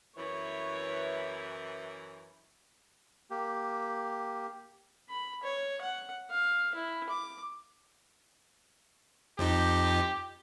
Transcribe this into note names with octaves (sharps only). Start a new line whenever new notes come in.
F#2 E3 C#5 B5
A#3 G4
B5
C#5
F#5
F5
E4
D6
F2 F3 D#4 G4